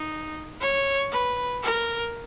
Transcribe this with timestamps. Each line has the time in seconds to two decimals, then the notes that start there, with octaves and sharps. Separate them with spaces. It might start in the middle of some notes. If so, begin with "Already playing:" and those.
Already playing: D#4
0.61 C#5
1.12 B4
1.63 A#4